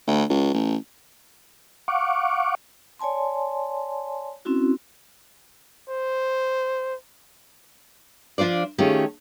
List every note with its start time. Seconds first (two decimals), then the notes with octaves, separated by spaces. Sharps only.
0.08 D2
0.30 C#2
0.54 A1
1.88 F5 F#5 C#6 D6
2.99 C#5 D5 G#5 A5 C6
4.45 C4 C#4 E4 F#4
5.90 C5
8.38 F3 D4 F4 C5 D5
8.78 D#3 A3 C#4 F4 G4 G#4